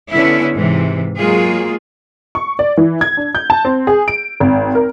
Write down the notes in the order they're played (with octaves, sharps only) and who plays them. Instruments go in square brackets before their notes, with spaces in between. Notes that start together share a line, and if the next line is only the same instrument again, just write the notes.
[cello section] D3 B3 C#4 E4
G#2 C3 E3
F#3 G#3 A#3 F4 G#4
[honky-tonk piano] C#6
D5
E3
G#6
D4
G6
A5
C4
G#4
D7
G#1
A#4